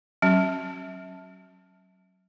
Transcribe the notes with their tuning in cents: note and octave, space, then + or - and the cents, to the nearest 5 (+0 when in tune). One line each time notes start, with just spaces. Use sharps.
F#3 +15 C#4 -35